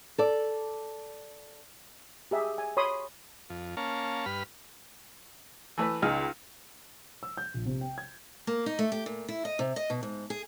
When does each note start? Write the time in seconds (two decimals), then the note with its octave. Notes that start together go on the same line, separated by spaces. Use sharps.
0.18 A4 D5
2.31 G4 G#4 E5
2.58 G#5
2.77 C#5 B5 C6 D#6
3.50 F2
3.77 A#3 C#4 F5 A5
4.26 G2 B4 B5 F6
5.78 E3 A3 B4
6.02 C#2 D#4 G#5 F6
7.23 E6
7.37 G6
7.54 A#1
7.66 C3
7.81 G5
7.98 G#6
8.47 A#3
8.66 D#4
8.79 A3
8.92 G4
9.06 A#2
9.28 E4
9.45 D#5
9.59 C3
9.76 D#5
9.90 B2
10.03 G#2
10.30 G#4